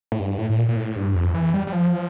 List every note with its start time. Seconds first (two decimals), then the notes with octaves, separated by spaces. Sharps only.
0.12 A2
0.19 G2
0.39 A2
0.50 A2
0.58 A#2
0.69 A#2
0.76 A2
0.96 G2
1.15 F2
1.34 E3
1.54 G3
1.67 G3
1.72 F3